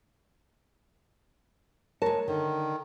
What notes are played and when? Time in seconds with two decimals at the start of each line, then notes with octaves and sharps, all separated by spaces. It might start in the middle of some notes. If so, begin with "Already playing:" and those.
2.02 G#3 A#4 C#5 A5
2.28 D3 D#3